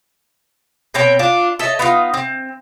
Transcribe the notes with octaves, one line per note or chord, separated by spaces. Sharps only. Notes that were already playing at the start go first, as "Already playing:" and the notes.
B2 C4 C#5 G5
D4 F4
A4 C#5 D#5 E5
B3 D#4 F4
C4